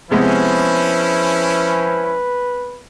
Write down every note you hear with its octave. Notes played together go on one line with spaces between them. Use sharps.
C3 F3 G#3 B3 C#4 E4 B4